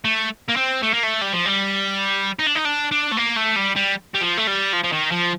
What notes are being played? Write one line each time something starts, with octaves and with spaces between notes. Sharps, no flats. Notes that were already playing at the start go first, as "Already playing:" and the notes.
A3
A#3
C4
A3
A#3
A3
G3
F3
G3
D#4
D4
D#4
D4
D4
A3
A#3
A3
G3
G3
G3
F3
A3
G3
F3
F3
D#3
F3